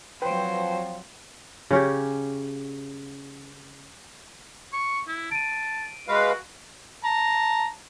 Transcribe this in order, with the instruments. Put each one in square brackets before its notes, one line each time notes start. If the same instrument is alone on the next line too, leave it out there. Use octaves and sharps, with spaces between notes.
[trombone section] F3 C4 [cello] F#3 C5 [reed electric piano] B4 G5
[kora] C#3 C#4 G4
[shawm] C#6
E4
[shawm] A5 [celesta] D7 D#7
[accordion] G#3 B4 F5 [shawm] F#4
[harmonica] A5 A#5